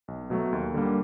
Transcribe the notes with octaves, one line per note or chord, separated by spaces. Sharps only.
B1
B2 F#3 A3
D#2
D3 G3 A#3